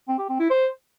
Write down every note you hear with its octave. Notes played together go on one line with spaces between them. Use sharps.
C4
G4
C4
E4
C5